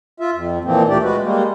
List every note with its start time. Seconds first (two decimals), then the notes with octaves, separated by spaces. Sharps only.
0.20 F4 E5
0.34 F2
0.64 A#2 E3 F3 A#3 C4
0.88 D2 A#2 A3 D4 G4 D5
1.04 G#3 F#4 B4
1.22 G3 G#3 A#3